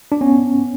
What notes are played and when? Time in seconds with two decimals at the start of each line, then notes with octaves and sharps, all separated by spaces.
0.12 D4
0.21 B3 C#4